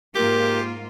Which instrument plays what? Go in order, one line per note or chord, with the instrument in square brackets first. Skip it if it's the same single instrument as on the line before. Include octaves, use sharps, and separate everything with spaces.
[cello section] G#2 A#3 F4 [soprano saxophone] G4 [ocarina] A#4